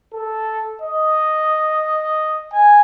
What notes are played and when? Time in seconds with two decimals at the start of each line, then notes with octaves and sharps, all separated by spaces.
0.14 A4
0.82 D#5
2.52 G#5